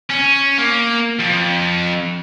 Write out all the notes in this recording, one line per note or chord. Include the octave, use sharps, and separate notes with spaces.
C#4
A#3
F2